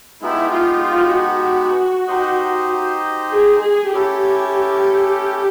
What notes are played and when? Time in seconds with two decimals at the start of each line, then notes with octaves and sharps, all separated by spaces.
0.22 G#3 B3 D#4 E4 G4
0.52 F4
0.84 F4
1.15 F#4
2.08 D#4 G4 C5 D#5
3.32 G#4
3.63 G#4
3.94 C#4 E4 G4 A4